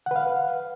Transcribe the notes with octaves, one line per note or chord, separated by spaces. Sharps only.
B4 F5 F#5